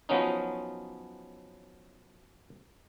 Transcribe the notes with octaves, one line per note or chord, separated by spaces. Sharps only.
F3 F#3 B3 C#4 D#4